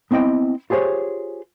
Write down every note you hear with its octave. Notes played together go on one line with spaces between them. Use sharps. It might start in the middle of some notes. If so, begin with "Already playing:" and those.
B3 C4 E4 D#5 G5
F4 G4 G#4 C5 C#5